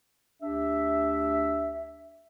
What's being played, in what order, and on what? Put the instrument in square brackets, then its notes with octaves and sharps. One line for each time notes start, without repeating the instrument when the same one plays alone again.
[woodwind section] D2 D4 G4 E5